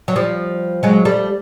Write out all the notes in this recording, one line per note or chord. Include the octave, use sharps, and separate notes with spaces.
F#3
F3 G3
F#3 G#3
G3 A3